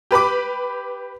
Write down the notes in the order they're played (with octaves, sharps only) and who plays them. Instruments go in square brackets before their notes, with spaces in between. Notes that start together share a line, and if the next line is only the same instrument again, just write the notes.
[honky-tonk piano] G4 B4 B5 D6